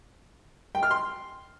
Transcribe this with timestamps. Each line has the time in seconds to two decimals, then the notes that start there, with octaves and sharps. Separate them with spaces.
0.75 G5
0.83 F6
0.91 C6